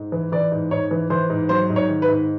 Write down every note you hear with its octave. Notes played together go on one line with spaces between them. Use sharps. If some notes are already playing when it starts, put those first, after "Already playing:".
Already playing: G#2
E3
E3 D5
G#2
G#2 C#5
E3
E3 C5
G#2
F#3 C5
G#2
C#5
D#3
B4
G#2